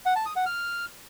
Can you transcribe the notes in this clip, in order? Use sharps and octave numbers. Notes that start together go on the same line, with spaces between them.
F#5
A5
D#6
F#5
F6